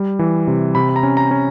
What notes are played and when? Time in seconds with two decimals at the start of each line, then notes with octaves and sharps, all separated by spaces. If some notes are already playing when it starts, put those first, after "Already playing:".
Already playing: G3
0.19 E3
0.47 C3
0.75 C3 B5
0.89 B5
0.96 A#5
1.03 C#4
1.17 A#5
1.31 C#4